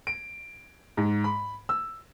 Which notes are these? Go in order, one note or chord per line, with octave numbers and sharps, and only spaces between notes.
D7
G#2
B5
E6